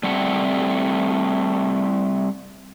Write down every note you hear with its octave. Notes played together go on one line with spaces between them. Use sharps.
G3 A3 C4 F#5